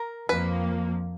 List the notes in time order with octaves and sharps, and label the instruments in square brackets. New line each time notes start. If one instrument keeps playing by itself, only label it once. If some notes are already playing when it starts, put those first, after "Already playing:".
Already playing: [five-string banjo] A#4
[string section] F2 F3 A#3 [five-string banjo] B4